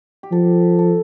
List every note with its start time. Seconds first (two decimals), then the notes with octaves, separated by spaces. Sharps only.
0.23 G4
0.32 F3 A4
0.79 A4